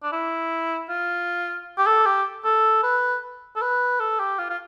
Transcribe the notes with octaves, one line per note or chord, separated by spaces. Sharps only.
D4
E4
F4
G4
A4
G4
A4
B4
A4
B4
A4
G4
F4
F4